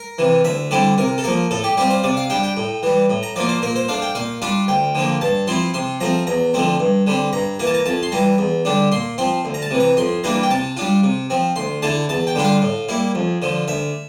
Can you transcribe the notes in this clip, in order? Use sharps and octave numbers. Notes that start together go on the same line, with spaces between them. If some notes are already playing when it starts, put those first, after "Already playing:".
Already playing: A#4
C3 E3
D2 E5
D3 G3 C4 E4 D5
C3 A#4
A4
F3 A#3 A#4
A2 A4
G4
G3 C4 F4 G4
C5
C3 D5
F5
G3 D4 G5
G5
A2
E3 G3
A2
A#5
F3 A#3 F4 D5
C5
A#2 A#4
C5
A3 D4 F5
G5
A#2 F5
G3 D4 F4 F5
D2 G5
D3 F3 A#3
G2 A5
F3 C4 E4 C6
C3 C6
F3 A3 C4 A#5
E2 A#5
D3 F3 A3 C4
G2
D3 G3 C4
G2 A#5
E3 A#3 A#5
A5
A#5
F2 A5
C6
E3 G3 A#5
E2
D3 G3 D4
A#2 C6
F3 C4 C6
D2
A#5
A5
C3 E3
A#5
F2 C6
E3 G3 A#3 D4 A#5
G5
C3 A5
G3 D4 F4
C3
F3 C4
D2 C6
D3 A3 E4 A5
E2 A5
G5
D3 G3 D4 F4
F5
A2
G3 A#3 E4
F2
D3 F3
D2 E5